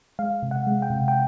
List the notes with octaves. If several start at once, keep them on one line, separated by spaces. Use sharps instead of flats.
G#3 F5
C3
F#5
G#3
G5
C3
G5